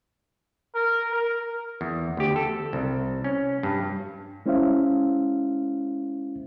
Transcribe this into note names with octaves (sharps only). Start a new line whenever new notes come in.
A#4
A#4
E2
D2 G4
A4
C2
C#4
G2
G#3 C#4 E4 C5 E5 F5